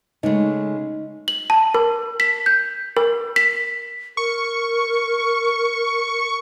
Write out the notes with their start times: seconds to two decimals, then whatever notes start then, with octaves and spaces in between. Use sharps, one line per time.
0.23 C#3 G#3 A3 D#4 D#5
1.28 F#7
1.50 A5
1.74 A#4
2.20 B6
2.46 G6
2.97 A#4
3.36 B6
4.17 A#4 C#6